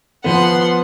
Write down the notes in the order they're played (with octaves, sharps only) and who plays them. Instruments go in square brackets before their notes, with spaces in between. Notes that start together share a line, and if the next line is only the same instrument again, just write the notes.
[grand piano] F3 B3 [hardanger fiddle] F#5 C6